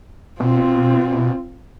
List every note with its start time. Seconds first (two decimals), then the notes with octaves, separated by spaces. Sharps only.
0.40 B2 C4 F4